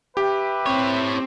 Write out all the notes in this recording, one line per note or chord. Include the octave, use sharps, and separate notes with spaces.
G4 B4 E5 G5
C4 E4 C#5